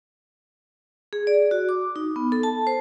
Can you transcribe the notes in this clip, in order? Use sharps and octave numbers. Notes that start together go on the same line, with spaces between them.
G#4
D5
F#4
D6
D#4
B3
A4
A5
C5